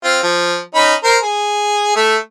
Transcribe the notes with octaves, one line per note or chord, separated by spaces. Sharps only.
C4 F4
F3
C#4 D#4 B5
A#4 C5
G#4
A3 E5